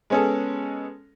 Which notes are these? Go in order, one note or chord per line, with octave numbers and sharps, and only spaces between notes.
G#3 B3 C#4 G#4 A4